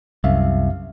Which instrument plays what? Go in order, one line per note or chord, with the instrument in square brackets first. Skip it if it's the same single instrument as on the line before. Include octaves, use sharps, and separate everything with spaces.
[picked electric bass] C2 [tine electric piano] F#2 E5 F5